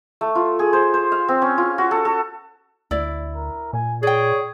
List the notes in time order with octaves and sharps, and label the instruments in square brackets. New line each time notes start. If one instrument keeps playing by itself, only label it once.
[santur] A3
F4
G#4
C5
C5
F5
C4
C#4
F4
F#4
A4
A4
[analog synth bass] D2 [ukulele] E4 D5
[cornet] A#4
[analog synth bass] A#2 [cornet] G#5
[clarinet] G#4 [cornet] C#5 [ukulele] D5 G5